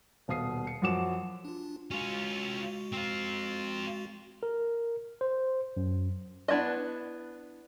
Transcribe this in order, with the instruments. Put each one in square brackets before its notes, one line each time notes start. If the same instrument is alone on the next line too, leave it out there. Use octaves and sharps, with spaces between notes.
[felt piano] D#1 B2 F5 D#6 C7
C#7
F#2 F3 F#4 D6 E7
[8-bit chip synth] D4 F4
[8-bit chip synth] G#3 F#4 [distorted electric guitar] C#4 F4
[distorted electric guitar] C4 F4
[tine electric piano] A#4
C5
F#2
[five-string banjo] B3 D4 E4 D5 D#5